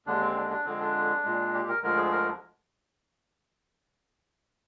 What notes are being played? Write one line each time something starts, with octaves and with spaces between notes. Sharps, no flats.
D#2 D3 G#3 D4
C4
D4
D4
F2 D3 G#3 C4
D4
A#2 G#3
G4
A#4
D2 D3 F3 G#3 A#4
G#4
A#4